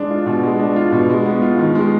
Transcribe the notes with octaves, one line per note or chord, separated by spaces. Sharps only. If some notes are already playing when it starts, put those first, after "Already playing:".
Already playing: G#3 D4
F4
B2
G#3
D4
F4
B2
G#3
B3
F4
D#3
G#3